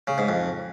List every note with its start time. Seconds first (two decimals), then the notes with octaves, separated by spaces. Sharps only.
0.07 C#3
0.18 G#2
0.29 F2